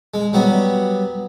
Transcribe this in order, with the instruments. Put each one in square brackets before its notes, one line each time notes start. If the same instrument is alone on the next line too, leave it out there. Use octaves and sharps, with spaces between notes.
[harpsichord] G#3
F#3 G3 B3